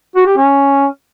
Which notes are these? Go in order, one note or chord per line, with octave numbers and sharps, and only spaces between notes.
F#4
G4
C#4